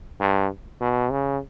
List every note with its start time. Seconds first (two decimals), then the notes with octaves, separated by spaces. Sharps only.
0.20 G2
0.81 B2
1.11 C#3